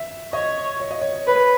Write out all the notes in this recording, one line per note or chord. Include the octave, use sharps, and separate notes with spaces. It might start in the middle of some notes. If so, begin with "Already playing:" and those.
Already playing: E5
C#5 D#5
C#5
D#5
C#5
B4 C#5